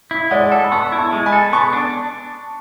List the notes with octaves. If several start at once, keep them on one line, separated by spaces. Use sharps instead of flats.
E4
G#3 D5 F#5
A4
B5
B3 A5 C#6
E4
A5 C#6
G#3
G#5 B5
A4
B3 A5 C#6
D4